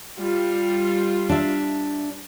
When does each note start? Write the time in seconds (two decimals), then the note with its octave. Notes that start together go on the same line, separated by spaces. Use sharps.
0.19 G3 F4
1.29 D4 E5